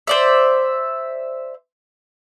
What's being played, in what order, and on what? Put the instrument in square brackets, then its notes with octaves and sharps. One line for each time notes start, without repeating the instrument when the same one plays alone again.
[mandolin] C5 D5 E5